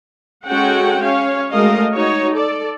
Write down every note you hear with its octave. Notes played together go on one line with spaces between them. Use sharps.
G#3 C#4 F#4 A4 F#5 G5
C#4 C#5 F5
G#3 A3 F#4 A#4 D#5 F5
D#4 F#4 C#5
A4 D5